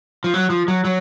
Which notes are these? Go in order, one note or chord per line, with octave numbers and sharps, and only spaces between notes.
F3
F#3
F3
F#3
F#3